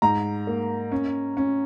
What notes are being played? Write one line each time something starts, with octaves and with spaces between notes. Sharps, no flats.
G#2 A#5
A#3
C#4
C#4